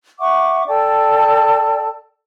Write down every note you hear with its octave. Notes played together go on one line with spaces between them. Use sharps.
E5 F#5 C#6 D6
A4 D5 G5 A5